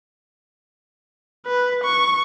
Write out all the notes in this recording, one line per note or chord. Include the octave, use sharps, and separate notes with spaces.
B4
C#6